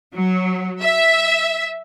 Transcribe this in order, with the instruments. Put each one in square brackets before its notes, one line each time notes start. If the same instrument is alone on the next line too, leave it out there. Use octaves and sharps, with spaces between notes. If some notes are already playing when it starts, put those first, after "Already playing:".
[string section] F#3
E5